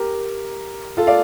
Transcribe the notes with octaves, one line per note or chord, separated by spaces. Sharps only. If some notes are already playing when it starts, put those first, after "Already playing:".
Already playing: G4 A#4
F4 A4
D5 F5